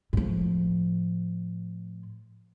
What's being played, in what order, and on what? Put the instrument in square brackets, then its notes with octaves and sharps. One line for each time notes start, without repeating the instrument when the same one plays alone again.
[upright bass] A2 F3